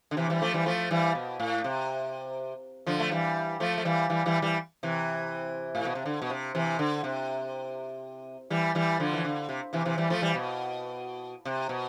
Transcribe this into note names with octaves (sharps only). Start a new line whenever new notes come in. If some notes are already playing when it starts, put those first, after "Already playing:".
D3
C3 E3
E3 G3
F3 A3
E3 G3
F3 A3
E3 G3
B2
A2
C3
D3 F3
A3
E3 G3
F3 A3
A3
E3 G3
E3 G3
E3 G3
E3 G3
C3 E3
A2
B2
C3
D3
B2
C3
C3 E3
D3
C3
E3 G3
E3 G3
D3 F3
E3
D3
C3
C3 E3
C3 E3
E3 G3
F3 A3
E3 G3
B2
C3
B2